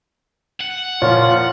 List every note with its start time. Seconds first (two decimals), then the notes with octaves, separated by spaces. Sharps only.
0.60 F#5
1.02 A#2 F3 F4 C#5